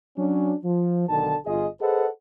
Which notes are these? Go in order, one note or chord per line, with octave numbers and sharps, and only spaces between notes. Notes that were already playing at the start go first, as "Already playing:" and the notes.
F#3 C#4 D4
F3
B1 D3 D#3 A5
G1 F4 G#4 D#5
G#4 A4 B4 C5 D#5 F#5